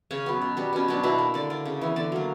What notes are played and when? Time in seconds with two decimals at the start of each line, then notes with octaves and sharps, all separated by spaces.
0.11 C#3 C#4
0.26 F#3 B3
0.42 B2
0.57 G3 B3
0.73 B2 C#4
0.88 F#3 B3 D4
1.03 B2 E4
1.19 A#3
1.34 D3 D5
1.50 A#3 D5
1.65 C#3
1.82 E3 B3
1.96 D3 D5
2.12 F#3 A#3